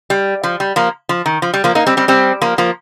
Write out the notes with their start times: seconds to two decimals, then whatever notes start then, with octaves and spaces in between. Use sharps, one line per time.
0.10 G3
0.43 F3
0.60 G3
0.76 F3 A#3
1.09 F3
1.26 D#3
1.42 F3
1.54 G3
1.64 F3 A#3
1.75 A#3 D#4
1.86 G3 C4
1.97 G3 C4
2.08 G3 C4
2.41 F3 A#3
2.58 F3 A#3